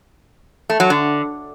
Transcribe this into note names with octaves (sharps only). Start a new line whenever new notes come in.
A3
F#3
D3